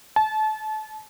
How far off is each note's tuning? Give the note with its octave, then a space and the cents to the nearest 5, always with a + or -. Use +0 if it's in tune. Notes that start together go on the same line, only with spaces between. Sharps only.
A5 -30